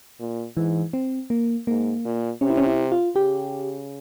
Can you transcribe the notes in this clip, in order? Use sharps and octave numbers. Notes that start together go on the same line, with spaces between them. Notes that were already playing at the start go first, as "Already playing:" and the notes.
A#2
G#2 E3
C4
A#3
G#2 A#3
A#2
C3 C#4
E4
C#4
E4
F4
C#3 G4